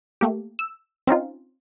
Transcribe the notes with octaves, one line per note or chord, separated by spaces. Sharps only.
A3 A#3 G4
E6
C4 C#4 D#4 F4